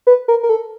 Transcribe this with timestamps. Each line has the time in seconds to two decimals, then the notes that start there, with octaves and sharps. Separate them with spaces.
0.07 B4
0.28 A#4
0.43 A#4
0.49 A4